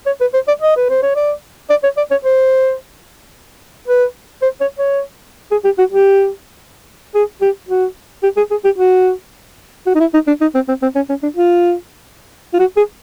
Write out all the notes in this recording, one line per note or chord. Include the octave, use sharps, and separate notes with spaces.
C#5
B4
C5
D5
D#5
B4
C5
C#5
D5
D5
C#5
D5
C#5
C5
B4
C5
C#5
C#5
G#4
G4
F#4
G4
G#4
G4
F#4
G4
G#4
G#4
G4
F#4
F#4
D#4
E4
D#4
D4
D#4
C4
C4
C4
C#4
C#4
D4
F4
F4
F#4
G#4